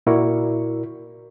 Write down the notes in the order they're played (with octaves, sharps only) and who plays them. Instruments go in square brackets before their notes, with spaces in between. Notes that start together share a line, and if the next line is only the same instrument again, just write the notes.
[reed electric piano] A#2 E4 F#4 A#4 D5 C#6